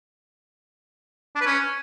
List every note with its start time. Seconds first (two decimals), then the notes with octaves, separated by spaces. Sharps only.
1.35 D4
1.41 B4
1.46 C#4